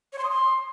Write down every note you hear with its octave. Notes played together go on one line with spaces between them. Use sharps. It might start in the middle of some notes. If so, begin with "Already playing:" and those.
C#5
C6
D#6
C6